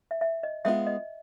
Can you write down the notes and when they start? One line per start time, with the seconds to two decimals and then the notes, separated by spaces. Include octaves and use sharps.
0.11 E5
0.21 E5
0.43 D#5
0.65 G#3 B3 D4 F4 E5
0.87 D#5